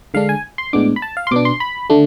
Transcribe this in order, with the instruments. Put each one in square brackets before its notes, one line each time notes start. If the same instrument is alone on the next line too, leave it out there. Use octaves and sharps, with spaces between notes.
[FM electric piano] D3 G#3 D4 F5
G#5
C6
A2 G#3 B3 D4 D6
B5
A5
F5
C6
B2 B3 D4 D6
C6
B5
D3 A3 D4